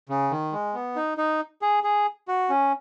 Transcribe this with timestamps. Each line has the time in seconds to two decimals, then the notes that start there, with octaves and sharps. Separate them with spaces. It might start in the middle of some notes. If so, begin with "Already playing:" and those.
0.09 C#3
0.31 D#3
0.52 G#3
0.74 B3
0.96 D#4
1.18 D#4
1.62 G#4
1.83 G#4
2.28 F#4
2.50 C#4